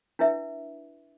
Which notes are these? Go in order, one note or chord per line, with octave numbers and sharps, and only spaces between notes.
D4 E4 B4 E5